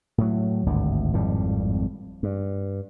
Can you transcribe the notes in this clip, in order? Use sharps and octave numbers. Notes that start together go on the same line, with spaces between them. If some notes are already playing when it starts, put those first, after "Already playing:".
A2 F#3
G#1 D2 G2
G#1 F2 A2 G3
G2